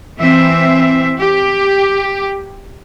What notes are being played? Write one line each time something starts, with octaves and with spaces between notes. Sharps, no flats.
E3 C4 E5
G4